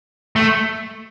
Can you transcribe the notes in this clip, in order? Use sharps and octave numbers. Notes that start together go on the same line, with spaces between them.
A3